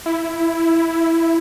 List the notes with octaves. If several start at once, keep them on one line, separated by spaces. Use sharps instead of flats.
E4